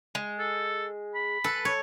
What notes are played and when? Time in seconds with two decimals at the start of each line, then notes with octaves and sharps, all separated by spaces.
0.15 G#3
0.39 A4
1.14 B5
1.44 A4 B4
1.65 C#5